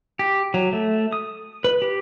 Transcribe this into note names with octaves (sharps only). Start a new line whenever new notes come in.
G4
F#3
A3
D#6
B4
G4